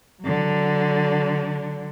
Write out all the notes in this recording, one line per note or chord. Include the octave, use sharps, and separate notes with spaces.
D3 F#3